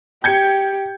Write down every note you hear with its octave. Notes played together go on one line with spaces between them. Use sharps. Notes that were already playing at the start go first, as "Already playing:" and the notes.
G4 G6 G#6 C#7